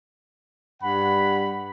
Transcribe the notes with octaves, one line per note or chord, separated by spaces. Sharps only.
G2 F#5 B5